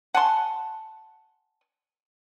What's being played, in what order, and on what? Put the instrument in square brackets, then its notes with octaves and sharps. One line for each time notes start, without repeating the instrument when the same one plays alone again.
[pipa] F#5 G#5 A5 C6